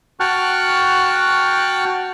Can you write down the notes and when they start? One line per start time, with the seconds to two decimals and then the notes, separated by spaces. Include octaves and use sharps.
0.20 F#4 G5 A5 C#6 F6 F#6